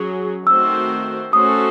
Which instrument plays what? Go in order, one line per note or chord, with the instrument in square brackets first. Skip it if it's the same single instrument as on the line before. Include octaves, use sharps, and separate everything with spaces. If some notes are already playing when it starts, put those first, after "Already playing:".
Already playing: [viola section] F#3 C#4 G#4
[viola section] D#3 A3 C4 F#4 C5 [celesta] E6
[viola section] A3 C#4 F#4 A4 C5 [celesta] D#6